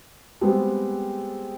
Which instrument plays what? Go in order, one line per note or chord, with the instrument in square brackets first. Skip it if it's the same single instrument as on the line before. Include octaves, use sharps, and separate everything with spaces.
[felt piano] G3 G#3 B3 C4